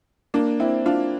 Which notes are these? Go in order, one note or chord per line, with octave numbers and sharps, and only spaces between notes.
A#3 D4
C4 E4
D4 F4